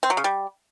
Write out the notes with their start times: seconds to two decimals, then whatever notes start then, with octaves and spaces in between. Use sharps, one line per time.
0.03 C4
0.10 F#3
0.17 C#3
0.24 G3